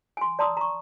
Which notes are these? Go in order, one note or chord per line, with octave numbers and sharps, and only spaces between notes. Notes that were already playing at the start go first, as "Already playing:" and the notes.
G#5 C6
D5 A5 A#5 C6 D#6 E6
A#5 C#6